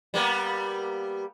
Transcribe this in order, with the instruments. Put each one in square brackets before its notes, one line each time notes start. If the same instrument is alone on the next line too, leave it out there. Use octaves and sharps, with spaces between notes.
[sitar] G3 A#3 B3